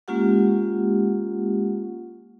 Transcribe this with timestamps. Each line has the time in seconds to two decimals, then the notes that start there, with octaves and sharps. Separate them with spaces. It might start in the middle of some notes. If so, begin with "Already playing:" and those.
0.08 G#3 A#3 C#4 F4 G4 F#5